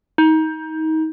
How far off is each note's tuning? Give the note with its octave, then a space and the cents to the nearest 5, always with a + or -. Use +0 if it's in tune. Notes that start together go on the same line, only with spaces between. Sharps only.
D#4 +25